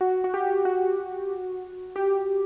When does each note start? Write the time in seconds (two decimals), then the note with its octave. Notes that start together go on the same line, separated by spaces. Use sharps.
0.01 F#4
0.24 F#4
0.34 G4
0.65 F#4
1.96 G4